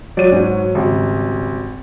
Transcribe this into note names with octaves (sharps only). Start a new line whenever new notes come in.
F#3 D5 D#7
G#2 F#4
G#1 C#3 G3